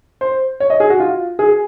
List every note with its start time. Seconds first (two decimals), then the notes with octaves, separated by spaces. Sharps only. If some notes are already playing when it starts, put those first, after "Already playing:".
0.21 C5
0.60 C#5
0.70 D#5
0.80 G#4
0.90 F#4
1.00 F4
1.39 G#4